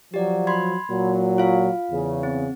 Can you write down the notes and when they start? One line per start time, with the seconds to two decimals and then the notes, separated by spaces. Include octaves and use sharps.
0.14 F3 F#3 G4 D5
0.47 B5 C6 G#6
0.90 A#2 F#3
1.38 F4 F5
1.92 E2 C#3
2.23 C4